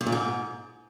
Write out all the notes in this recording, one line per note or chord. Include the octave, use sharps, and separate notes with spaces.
G2
A#2
G#2